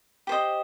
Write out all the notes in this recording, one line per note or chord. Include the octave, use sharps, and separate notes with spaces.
G4 C5 D#5